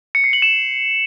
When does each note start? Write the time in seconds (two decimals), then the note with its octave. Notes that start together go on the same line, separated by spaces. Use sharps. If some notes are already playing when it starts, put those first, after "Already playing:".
0.15 C#7
0.24 C7
0.33 F#7
0.42 E7